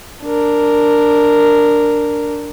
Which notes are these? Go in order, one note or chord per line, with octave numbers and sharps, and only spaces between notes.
D4 A#4